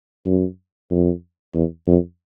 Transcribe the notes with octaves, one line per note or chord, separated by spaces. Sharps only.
F#2
F2
E2
F2